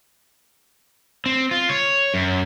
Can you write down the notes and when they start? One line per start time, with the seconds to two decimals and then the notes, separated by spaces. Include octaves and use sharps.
1.26 C4
1.51 F4
1.70 C#5
2.14 F#2